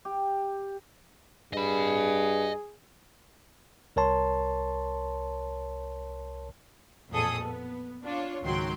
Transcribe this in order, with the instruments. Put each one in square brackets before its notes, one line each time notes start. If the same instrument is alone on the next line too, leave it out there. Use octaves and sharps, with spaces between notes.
[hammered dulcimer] G4
[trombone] G2 [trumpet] G#4 [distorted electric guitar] D#5 B5
[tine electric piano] C2 A#4 C#5 A5 C6
[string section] A1 F2 A#2 G#4 A4 D#6
B3
D4 F4 C#5
C#2 G#2 D#3 F#3 G5 C6